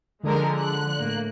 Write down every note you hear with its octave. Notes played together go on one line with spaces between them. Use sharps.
D3 F3 G#3 A#4
F#6
A2 A#3